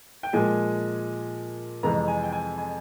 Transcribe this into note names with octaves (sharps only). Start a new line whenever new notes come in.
G5
A#2 F3 G#3 G#5
F2 C3 E3 G#3 A#5
G#5
G5
G#5
G#5